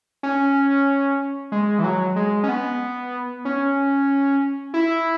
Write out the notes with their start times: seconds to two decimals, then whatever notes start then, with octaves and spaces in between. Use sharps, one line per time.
0.23 C#4
1.52 G#3
1.79 E3
1.84 F#3
2.16 G#3
2.43 C#4
2.49 B3
3.45 C#4
4.74 E4